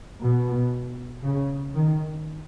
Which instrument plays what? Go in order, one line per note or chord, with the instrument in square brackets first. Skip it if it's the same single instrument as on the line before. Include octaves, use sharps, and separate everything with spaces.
[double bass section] B2
C#3
D#3